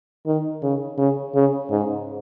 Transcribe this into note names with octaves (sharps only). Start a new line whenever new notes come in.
D#3
C#3
C#3
C#3
G#2